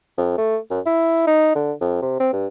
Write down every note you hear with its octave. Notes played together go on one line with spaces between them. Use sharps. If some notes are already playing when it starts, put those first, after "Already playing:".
F2
A3
F#2
E4
D#4
D3
F2
C3
C4
G2